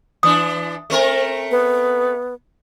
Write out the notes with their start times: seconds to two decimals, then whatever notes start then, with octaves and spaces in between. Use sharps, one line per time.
0.23 E3 D4 D#6
0.90 A3 C4 A#4
1.51 B3